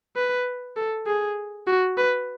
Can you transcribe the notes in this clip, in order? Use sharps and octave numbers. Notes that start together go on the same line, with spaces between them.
B4
A4
G#4
F#4
B4